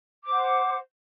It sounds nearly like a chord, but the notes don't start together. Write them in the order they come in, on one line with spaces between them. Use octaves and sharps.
D6 C5 F#5